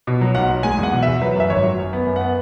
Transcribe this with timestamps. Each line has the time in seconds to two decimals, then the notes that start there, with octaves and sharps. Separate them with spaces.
0.07 B2
0.21 F#3
0.35 B1 F#5
0.49 F#3
0.63 G#3 G#5
0.78 E2
0.83 F#5
0.93 B2
1.02 E2 E5
1.22 F#3 B4
1.35 F#2 E5
1.50 G#1 C#5
1.64 F#3
1.78 F#2
1.93 B3
2.07 F#2
2.16 B3 F#5